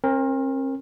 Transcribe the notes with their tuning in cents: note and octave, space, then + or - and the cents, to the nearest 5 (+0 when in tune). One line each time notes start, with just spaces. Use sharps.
C4 +45 A#4 +0